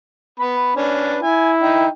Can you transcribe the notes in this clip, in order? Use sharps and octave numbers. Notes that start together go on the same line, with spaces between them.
B3 B5
C#4 D4 B4
E4 G#5
D#4 G5